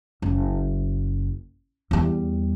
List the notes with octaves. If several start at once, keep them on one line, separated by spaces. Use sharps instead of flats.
F#1
E2 G3